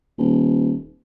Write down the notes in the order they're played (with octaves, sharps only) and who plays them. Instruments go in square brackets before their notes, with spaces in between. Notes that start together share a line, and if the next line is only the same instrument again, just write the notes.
[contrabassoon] D#1